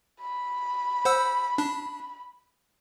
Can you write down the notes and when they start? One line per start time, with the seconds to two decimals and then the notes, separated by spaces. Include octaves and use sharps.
0.21 B5
1.05 C5 F#5 E6
1.58 D4